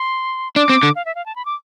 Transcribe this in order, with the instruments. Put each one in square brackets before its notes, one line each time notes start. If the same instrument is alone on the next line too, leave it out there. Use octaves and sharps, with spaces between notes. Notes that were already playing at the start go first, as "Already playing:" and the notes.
Already playing: [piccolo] C6
[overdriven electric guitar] D4 [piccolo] D6
[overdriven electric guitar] C4
D3
[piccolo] F5
E5
F5
A5
B5
D6